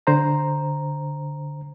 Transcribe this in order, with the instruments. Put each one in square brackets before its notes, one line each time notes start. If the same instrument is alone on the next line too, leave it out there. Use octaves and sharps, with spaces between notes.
[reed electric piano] D3 C5 A#5